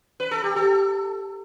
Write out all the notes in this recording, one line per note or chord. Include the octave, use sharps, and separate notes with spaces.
B4
A4
G4
A4